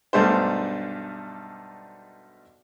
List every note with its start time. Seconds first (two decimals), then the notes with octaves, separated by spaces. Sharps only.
0.13 B1 G2 G#3 A3 D4 C5